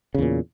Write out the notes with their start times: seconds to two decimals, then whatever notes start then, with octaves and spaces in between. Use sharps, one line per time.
0.14 C#3
0.18 E2
0.22 A#2